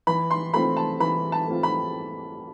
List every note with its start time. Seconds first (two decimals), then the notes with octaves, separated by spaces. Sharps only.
0.07 E3 B5
0.31 C6
0.54 A3 C4 F4 B5
0.77 A5
1.00 E3 B5
1.32 A5
1.48 A3 C4 F4
1.63 B5